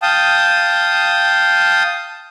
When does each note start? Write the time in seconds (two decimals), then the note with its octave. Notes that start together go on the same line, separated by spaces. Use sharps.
0.02 F5 G5 A5 D#6